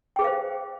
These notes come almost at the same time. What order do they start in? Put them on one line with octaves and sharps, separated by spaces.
G5 G#4 B4 F5 C5